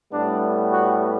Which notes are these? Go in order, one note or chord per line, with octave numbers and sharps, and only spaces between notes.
A2 G3 B3 D4
F#4